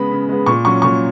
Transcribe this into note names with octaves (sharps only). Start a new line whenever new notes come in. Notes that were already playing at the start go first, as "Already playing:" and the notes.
Already playing: C#3 G#3 B3 B5
C#3
G#3 B3
A#2 C#6
F#3 C#4 C#6
A#2 C#6